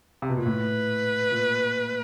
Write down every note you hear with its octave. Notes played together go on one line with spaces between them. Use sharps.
C3
B2
A#2
A2 B4
A#2